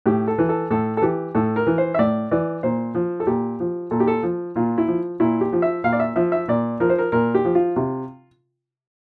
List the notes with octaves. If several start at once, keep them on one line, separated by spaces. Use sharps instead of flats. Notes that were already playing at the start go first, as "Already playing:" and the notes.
A2 G4
A4
E3
A4
A2 A4
A4
E3 G4
A2 A4
A#4
E3
C5
E5
A2 D5
E3 D5
A#2 C5
F3
A4
A#2 G4
F3
A#2 A4
G4
A4
F3
A#2 F4
E4
F3
A#2 E4
G4
F3
E5
A#2 F5
D5
E5
F3 E5
E5
A#2 D5
F3 A#4
C5
A#4
A#2 A#4
G4
F3
F4
C3